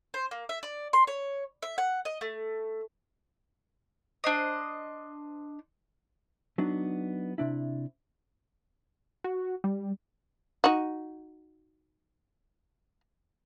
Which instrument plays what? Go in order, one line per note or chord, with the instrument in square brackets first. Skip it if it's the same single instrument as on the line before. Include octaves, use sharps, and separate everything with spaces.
[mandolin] C5
A#3
E5
D5
C6
C#5
E5
F#5
D#5
A3
D4 C5 D#5
[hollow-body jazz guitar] F#3 B3 D4 D#4
C3 D4 E4
[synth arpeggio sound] F#4
G3
[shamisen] D#4 F#4